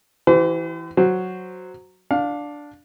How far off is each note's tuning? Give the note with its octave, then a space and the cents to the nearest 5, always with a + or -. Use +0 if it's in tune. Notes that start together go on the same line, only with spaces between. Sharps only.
E3 +0 G4 -45 C5 -45
F#3 +0 C5 -5
D4 +0 F5 +20